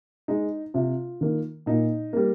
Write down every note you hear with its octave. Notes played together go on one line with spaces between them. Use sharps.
G#3 D#4
C3 F4
D#3 A#3
A#2 D#4
G3 A#3